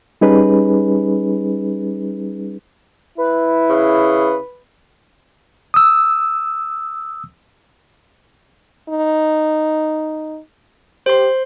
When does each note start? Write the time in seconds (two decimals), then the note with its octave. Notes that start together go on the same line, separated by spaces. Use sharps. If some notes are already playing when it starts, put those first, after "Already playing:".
0.21 G3 C#4 D#4 G#4 B4
3.18 E4 B4
3.70 C#3
5.74 D#6 E6
8.89 D#4
11.06 G4 C5 C6